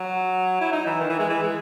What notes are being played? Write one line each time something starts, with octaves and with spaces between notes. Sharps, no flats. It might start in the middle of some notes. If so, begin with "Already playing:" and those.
Already playing: F#3
E4
D#4
E3
D#3
E3
G#3
E3
G#3